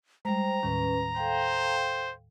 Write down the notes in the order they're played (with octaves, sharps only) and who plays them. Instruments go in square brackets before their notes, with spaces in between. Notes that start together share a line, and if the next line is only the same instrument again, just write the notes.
[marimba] G3 G#3 [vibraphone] C5 G5 [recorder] A#5
[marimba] D#2 A2 D#3 [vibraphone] C#4 B4
[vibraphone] A4 F5 G5 [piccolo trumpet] C5